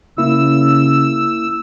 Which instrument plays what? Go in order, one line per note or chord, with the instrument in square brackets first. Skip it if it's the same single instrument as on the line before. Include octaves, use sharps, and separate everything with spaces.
[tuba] C#3 [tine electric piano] A#3 E4 [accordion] E6